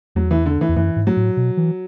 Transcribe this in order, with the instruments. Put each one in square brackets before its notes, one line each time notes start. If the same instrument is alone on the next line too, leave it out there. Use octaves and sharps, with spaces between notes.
[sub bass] E2 [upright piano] F#3
[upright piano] E3
D3
E3
[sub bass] E2
[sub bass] F#2 [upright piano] E3
[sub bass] G#2
[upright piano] F#3
[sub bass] A2
B2
E3